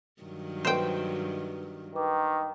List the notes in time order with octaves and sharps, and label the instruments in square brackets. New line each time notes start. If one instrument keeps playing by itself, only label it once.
[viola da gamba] G2 D#3 F#3
[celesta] B4 D#5 E5 [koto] C5 G5
[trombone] D#3 [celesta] B4 D6